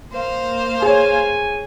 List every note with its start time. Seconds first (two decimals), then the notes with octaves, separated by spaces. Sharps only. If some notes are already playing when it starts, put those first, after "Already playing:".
0.13 A#3 C5 F5
0.82 G#4 C#5 G#5